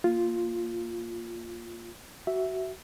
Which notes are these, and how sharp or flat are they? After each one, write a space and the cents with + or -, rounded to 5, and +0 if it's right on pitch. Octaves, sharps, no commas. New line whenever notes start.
A#3 +0 F4 +0
F#4 +20 E5 +0